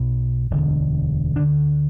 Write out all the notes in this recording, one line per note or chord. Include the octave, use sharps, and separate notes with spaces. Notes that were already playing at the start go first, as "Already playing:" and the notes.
Already playing: B1 B2
E1 D2 D3
D2 D3 D4